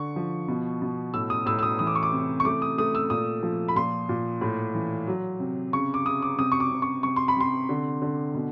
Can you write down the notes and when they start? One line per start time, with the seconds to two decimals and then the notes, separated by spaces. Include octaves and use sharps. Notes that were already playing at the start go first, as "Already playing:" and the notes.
Already playing: D3 C#6
0.16 F3
0.48 B2
0.82 B2
1.14 A2 E6
1.30 D#6
1.46 A2 E6
1.59 E6
1.63 D#6
1.79 E3 D#6
1.87 D6
1.95 C#6
2.03 D6
2.13 C3
2.40 C#6
2.45 A3 D6
2.62 D#6
2.78 A3 D#6
2.95 E6
3.10 A#2 D#6
3.43 F3
3.68 B5
3.76 A#2 C6
4.09 A#2
4.41 A2
4.75 E3
5.07 F#3
5.40 C3
5.73 C#3 C#6
5.94 D6
6.05 C#3 D#6
6.22 D6
6.38 C3 D#6
6.52 C#6
6.60 D6
6.72 C3
6.82 C#6
7.03 C3 C#6
7.16 C6
7.28 B5
7.37 C3 C6
7.69 D3
8.02 D3
8.34 B2